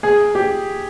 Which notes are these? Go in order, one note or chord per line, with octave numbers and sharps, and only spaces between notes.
G#4
G4